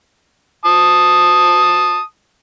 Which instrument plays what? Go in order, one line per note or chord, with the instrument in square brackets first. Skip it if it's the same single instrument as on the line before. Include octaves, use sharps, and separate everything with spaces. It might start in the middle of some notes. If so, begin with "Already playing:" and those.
[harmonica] A5 D#6